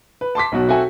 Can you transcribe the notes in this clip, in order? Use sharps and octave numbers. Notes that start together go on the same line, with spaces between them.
B4
A5 C6 D6 B6
B1 B2 F#3 F#4
C4 F#4 A4 E5 G5 G#5